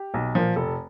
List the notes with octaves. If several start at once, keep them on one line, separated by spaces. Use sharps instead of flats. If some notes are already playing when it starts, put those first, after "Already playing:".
Already playing: G4
B1
A#2 F3
F1 A4